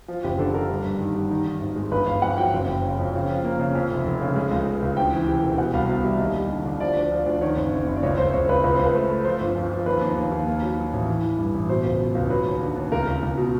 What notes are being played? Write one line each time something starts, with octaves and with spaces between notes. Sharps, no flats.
F3
F#1 G4
D3 A4
D3 A#4
G3
G2
D#3
G3
D#3
D#3
G#1
G#3
G1 B4
G1 F5
F2 F#5
F#3 G5
F#1
F#1
C#3
F2
C#3
F3
A#3
C#3
F2
F1
F1
C#3
G#3
C#2
C#2
C#2
D2 G5
E3
C3
E1
B2 F#5
C2 F5
B2 F5
G3 E5
D#2 D#5
G3
D3
D3
F3 D5
D2
F3
D2
D#3 C#5
F#1
F#1
F#1
D5
C#2 C#5
C#2 C5
C#2 C#5
C#2 B4
C#2 B4
C#2 C5
B4
A3
A3
F3 C5
G1
F2
F3
D#2 B4
D#2
D#2
D#2
A#3
F#3
F#3
A1
E3
E3
G2
A1
B2 C5
C#2
B2
C#2
F#3 B4
D#2
D3
D#2
C#2 A#4
C#2
C#2
B2